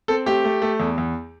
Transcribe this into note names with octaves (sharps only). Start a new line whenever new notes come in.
C4 A4
A3 G4
A3
A3
E2
E2